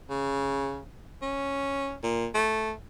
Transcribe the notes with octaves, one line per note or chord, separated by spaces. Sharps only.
C#3
C#4
A#2
A3